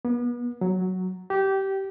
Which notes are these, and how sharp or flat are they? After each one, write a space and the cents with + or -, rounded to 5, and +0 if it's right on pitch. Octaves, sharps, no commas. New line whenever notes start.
B3 -35
F#3 +5
G4 -20